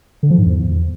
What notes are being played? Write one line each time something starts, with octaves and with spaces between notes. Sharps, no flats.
D3
F3
G#2
E2